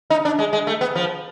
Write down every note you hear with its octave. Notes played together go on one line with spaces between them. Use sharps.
D#4
D4
G#3
G#3
A3
B3
F3